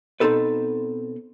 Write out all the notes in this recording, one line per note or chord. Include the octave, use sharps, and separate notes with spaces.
B2 C4 D#4 G4 A4 B4